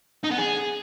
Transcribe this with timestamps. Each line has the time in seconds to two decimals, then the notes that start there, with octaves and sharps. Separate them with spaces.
0.23 D#4
0.31 B3
0.38 G#4